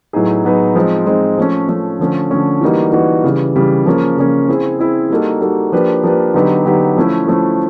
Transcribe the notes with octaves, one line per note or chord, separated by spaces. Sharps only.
A2 F#3 B3 D#4 G#4
A2 F#3 B3 D#4 G#4
F3 G#3 C4 D#4
F3 G#3 C4 D#4
F3 A3 C#4
F3 A3 C#4
D3 F3 A3 C#4
D3 F3 A3 C#4
E3 G3 A#3 D#4 F#4
E3 G3 A#3 D#4 F#4
C#3 E3 G3
C#3 E3 G3
C#3 F3 A#3 C#4
C#3 F3 A#3 C#4
C4 E4 G#4
C4 E4 G#4
G3 A#3 D#4 F#4 A4
G3 A#3 D#4 F#4 A4
F3 A#3 D4 G4 B4
F3 A#3 D4 G4 B4
D3 F#3 B3 D#4 G4
D3 F#3 B3 D#4 G4
F3 A3 C#4 E4
F3 A3 C#4 E4